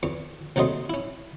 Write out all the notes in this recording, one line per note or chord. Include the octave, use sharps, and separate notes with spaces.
E2 C#6
D#2 C3 F#3 A3 D#5 C6
C#4 E4